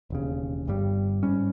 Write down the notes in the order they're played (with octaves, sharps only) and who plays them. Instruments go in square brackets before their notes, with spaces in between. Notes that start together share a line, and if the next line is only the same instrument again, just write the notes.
[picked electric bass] E1 D#2 C#3
G1 G2 G3
G#2 G3 C#4